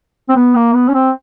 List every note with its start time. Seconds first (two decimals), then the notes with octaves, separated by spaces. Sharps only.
0.29 C4
0.36 B3
0.55 A#3
0.74 B3
0.89 C#4
0.94 C4